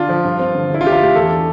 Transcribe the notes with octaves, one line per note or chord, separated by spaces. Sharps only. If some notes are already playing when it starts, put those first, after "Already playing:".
Already playing: D3 D4 F4
F3
G2
C4
D3
D3 E4
F4
D3 G4
F4
A3 G4
E2 A4
D4